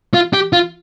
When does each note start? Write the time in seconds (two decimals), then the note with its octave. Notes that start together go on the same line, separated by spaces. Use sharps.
0.14 F4
0.33 G4
0.53 F4